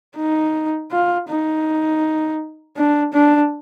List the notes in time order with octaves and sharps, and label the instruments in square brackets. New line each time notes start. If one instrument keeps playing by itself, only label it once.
[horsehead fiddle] D#4
F4
D#4
D4
D4